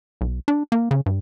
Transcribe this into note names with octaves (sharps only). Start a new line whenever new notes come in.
B1
D4
A#3
C#3
G2